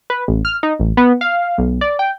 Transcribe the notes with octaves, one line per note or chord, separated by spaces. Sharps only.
B4
A1
F6
D#4
A1
B3
F5
B1
D5
G5